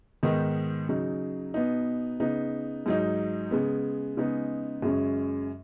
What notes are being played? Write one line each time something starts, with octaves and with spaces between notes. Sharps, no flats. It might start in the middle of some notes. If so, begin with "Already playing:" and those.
G#2 D#3 B3 D#4
C#3 F#3 D#4
B2 B3 D#4
C#3 B3 D#4
G#2 F#3 D#4
C#3 G#3 B3
C#3 G#3 B3 D#4
F#2 C#3 G#3 C#4